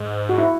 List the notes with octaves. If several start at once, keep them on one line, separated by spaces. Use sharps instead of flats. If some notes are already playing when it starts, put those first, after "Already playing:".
Already playing: G#2
F#4
E4